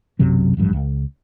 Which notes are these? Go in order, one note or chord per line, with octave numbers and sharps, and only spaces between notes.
B1 F#2 C3 F#3
D1 A1 G2 F3
C#2